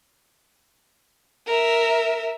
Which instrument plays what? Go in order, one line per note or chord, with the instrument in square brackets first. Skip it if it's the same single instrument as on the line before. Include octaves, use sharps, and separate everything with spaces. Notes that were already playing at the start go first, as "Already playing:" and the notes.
[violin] A#4 E5